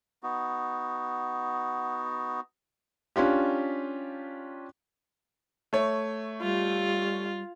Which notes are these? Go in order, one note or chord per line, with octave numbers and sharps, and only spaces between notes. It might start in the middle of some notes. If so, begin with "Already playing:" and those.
B3 D#4 F#4
C#4 D4 F4 G4
A3 C#5
G3 F4